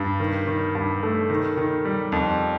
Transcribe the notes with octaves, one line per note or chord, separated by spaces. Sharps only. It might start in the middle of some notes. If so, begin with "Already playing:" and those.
Already playing: G2
D#3
D#3
G2
A3
D#3
D#3
G3
F2